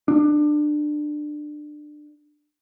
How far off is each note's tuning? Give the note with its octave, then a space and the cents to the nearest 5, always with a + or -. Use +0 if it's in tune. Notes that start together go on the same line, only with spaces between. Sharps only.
D4 +25